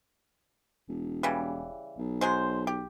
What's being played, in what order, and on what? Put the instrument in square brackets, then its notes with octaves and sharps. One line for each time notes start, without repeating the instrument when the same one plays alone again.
[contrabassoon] E1
[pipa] C#3 E3 G3
[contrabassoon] B1
[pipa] F#3 G#3 C5
G4